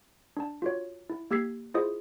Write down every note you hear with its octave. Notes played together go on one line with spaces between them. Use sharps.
D4 A5
F4 F#4 C#5
E4
A#3 G4 E6 G#6 B6 C7
E4 F4 G#4 C5 D#5 D#6